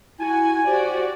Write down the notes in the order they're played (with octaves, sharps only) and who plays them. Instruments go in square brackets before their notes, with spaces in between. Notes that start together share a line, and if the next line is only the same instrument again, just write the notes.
[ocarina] E4 [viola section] F#4 [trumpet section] G#5
[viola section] F#4 G4 D5 [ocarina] C5